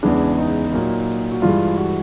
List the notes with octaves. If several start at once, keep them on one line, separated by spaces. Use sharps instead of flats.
E2 C#3 E3 G#3 B3 D4
D#4
A#2 F#3 A#3
F#4
G2 E3 G#3 F4
F#4